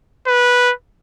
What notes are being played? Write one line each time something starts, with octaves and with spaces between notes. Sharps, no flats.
B4